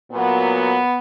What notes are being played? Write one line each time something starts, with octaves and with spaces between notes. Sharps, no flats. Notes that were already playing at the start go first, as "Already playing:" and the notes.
A#2 F#3 B3